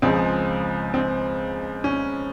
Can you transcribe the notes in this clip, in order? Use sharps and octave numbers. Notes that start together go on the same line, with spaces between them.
C#2 C#3 F3 G#3 C4
C4
C#4